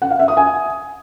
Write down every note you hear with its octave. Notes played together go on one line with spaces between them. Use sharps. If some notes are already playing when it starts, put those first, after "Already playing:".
F#5
F5
E5
D#6
G#5